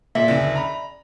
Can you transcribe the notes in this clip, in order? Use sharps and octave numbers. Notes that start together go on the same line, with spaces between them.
A#2 D5 E5
F#1 D2
A#5 B5